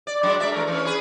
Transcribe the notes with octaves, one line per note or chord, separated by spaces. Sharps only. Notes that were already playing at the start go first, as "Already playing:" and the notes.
D5
F#3 G#3 D4
G#3 D5 E5
E3 A3 A#4
E3 C#4
G#4 B4